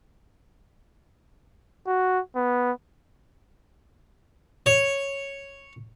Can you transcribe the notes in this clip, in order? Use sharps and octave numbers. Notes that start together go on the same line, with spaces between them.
F#4
B3
C#5